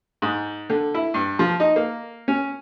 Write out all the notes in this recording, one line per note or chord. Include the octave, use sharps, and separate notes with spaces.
G#2
D3
E4
G2
F3
D#4
A#3
C#4